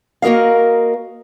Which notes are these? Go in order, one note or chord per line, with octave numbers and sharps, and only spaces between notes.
A#3 F#4 A#4 D#5 F5